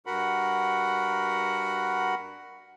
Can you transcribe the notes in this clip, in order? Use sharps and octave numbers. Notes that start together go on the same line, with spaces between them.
G2 F#4 A#4 F#5 B5